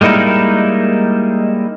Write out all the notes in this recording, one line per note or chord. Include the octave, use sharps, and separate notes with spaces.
G3 G#3 A#3 D#4 E4